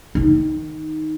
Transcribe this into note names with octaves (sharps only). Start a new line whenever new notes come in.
D#3 D#4